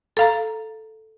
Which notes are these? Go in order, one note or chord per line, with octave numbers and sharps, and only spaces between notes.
A4 F5 A#5